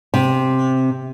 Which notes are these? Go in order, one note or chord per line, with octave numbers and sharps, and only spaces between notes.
C3